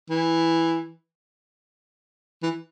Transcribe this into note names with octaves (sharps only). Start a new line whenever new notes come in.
E3
E3